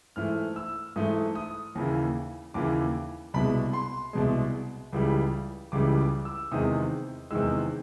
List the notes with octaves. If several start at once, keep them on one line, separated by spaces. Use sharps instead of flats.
G#2 E3 A3 F6
E6
G#2 E3 A3 D#6
D#6
D#2 C#3 E3
D#2 C#3 E3 D6
C2 B2 G#3 B5
C6
C2 B2 G#3
C#2 C#3 E3 G3
C#2 C#3 E3 G3 D6
D6
E6
E2 C3 D#3 G#3 D#6
E2 C3 D#3 G#3 E6